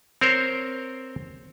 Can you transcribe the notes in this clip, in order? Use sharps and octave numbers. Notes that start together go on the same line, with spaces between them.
C4 A#4 C5 C#5